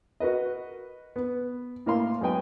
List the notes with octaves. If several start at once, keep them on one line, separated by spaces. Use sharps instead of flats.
F#4 A#4 B4 D#5
B3
A2 A#3 F5 C6
F#2 G#3 B3 G5 G#5